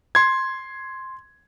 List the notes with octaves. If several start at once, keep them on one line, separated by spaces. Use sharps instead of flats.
C6 G#6